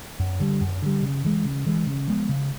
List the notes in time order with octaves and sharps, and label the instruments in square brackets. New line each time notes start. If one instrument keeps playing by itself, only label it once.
[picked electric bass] F#2
D3 G3
F#2
D3 G3
C#3
E3 G#3
C#3
E3 G#3
C#3
F3 G#3 B3
C#3